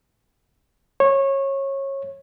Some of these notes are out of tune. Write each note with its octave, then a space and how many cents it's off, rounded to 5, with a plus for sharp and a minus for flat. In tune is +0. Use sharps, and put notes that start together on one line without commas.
C#5 -20